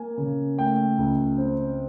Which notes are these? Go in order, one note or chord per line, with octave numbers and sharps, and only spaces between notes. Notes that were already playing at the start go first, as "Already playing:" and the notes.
Already playing: A#3 G#5
C#3
A3 G5
C#2
C4